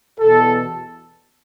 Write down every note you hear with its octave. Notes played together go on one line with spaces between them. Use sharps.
E2 B2 A4